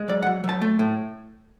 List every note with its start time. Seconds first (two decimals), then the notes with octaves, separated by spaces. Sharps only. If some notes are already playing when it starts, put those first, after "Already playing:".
Already playing: G#3
0.08 F#3 D5
0.22 F#5
0.26 F#3
0.44 F#3
0.49 A5
0.61 A3
0.79 A2